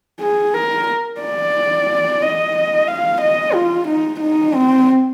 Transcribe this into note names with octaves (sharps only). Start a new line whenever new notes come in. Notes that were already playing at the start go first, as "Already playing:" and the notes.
G#4
A#4
D5
D#5
F5
D#5
F4
D#4
D#4
C4